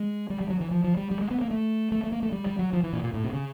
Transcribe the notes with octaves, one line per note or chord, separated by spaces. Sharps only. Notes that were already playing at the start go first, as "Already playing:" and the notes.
Already playing: G#3
G3
G3
F#3
E3
F3
F3
G3
G3
G#3
B3
A#3
A3
A3
A3
A#3
A3
G3
G3
F#3
F3
E3
A#2
A#2
A2
C3
C#3